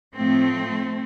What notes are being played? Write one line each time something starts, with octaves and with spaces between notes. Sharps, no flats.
A2 F3 A3 C4